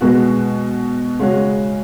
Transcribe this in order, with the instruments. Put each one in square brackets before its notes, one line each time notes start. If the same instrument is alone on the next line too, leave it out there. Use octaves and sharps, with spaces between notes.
[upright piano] B2 G#3 B3 F#4
C#3 G#3 C#4 F#4